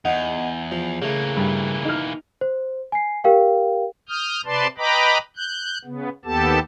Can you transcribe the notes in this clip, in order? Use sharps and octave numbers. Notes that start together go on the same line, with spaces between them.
E2 D#4 F#5
F3
C#3 E3 A3 A#3
G2
D#4 F6
C5
G#5 C7
G4 A#4 F5 G5
D#6 F6 G6
C3 B4 D5 A5 C6
B4 D#5 G5 A#5 B5 D6
F#6 G6
C#3 B3
D#2 B3 G4 A4 A5